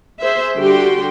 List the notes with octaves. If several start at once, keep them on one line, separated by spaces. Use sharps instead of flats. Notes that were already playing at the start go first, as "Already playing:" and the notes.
G#4 C5 E5
D3 G3 F#4 G4 G5 C6